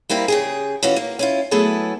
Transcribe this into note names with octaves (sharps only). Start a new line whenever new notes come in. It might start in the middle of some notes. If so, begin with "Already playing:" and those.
G3 A#3 C4 E4
C#3 G4 G#4
E3 C#4 F4 F#4
A#3
C#4 E4 F4
F#3 A3 B3 E4 G#4 A4